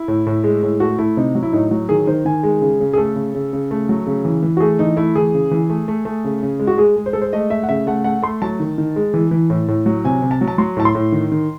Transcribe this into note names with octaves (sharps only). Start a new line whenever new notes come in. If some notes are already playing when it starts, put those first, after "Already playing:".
Already playing: E4
A2
A2
G#3
A2
A3 F#4
A3 E4
C3 D#4
F#3
E4
A2 D#4
F#3
D#3 G#4
D#3 C5
D#3 G#5
G#3
C#3
C#3
G#4
A3 A4
C#3
C#3
C#3
A3
F#3
C#3
E3
E3
F#4
A3 G#4
E3 D#4
A3 E4
E3 G#4
C#3
E3
A3
A3
A3
C#3
C#3
G#3
F#4
G#3 G#4
G#3
C5
G#3 A4
C5
A3 D#5
A3 E5
F#5
C#3 E5
A3 F#5
A3 F#5
A3 C6
F#3 A5
D#3
D#3
G#3
E3
E3
A2
A2
F#3
C3 G#5
C3
A5
F#3
A5
F#3 C6
A2 A5
C6
A2
D#3
D#3